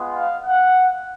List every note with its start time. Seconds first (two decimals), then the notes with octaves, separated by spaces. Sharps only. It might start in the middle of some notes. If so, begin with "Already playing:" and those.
Already playing: G#3 B3 F4
0.13 F5
0.44 F#5